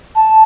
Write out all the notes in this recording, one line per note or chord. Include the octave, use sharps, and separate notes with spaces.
A5